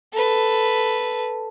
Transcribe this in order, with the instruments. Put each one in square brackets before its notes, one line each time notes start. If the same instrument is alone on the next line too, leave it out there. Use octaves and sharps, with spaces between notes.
[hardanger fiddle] A4 B4